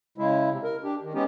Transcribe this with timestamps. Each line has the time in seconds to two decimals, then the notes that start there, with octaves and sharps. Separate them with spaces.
0.18 C#3 G#3 E4
0.50 C3
0.64 A#4
0.84 D4 G4
1.02 D#3
1.14 G#3 B3 C#4 D#4 G4